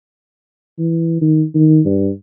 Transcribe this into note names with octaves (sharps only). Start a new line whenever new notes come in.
E3
D#3
D#3
G2